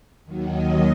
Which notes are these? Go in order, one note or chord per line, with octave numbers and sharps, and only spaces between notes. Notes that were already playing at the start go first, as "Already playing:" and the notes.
D#2 D#3 F#3
D#5